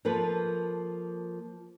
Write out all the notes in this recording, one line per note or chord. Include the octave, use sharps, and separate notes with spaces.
F3 A#3 A4 B4